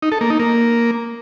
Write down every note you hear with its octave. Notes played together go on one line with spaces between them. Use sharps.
D#4
A4
A#3
D#4
A#3